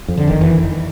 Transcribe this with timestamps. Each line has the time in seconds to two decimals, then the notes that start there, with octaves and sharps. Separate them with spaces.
0.08 F2
0.17 D3
0.28 F#1 D#3
0.41 E3